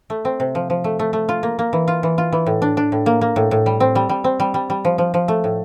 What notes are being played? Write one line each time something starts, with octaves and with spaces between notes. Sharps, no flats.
A3
C4
C3
F3
F3
A3
A3
A3
F4
A#3
A#3
E3
F4
E3
F4
E3
A2
D4
D4
A2
A#3
A#3
A2
A2
G3
C4
G3
G3
C4
G3
G3
G3
F3
F3
F3
A3
A2